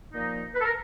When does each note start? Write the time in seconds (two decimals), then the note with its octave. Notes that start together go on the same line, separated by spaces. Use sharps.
0.13 A#2 F3 A#3 D#4
0.54 B4
0.60 A4
0.65 A#4